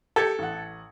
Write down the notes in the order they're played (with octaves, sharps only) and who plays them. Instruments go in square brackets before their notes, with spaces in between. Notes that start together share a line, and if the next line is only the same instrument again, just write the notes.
[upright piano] G4 G#6 C#7 [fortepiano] A4
[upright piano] A1 F#5